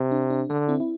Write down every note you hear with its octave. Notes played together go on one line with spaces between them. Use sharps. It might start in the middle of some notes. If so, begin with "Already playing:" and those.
Already playing: C3
D4
D4
D3 D4
C4 E4
E4